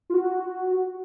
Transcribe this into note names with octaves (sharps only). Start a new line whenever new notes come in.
F4
F#4